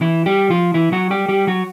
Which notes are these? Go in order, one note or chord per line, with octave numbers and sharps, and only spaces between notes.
E3 E4
G3 G4
F3 F4
E3 E4
F#3 F#4
G3 G4
G3 G4
F#3 F#4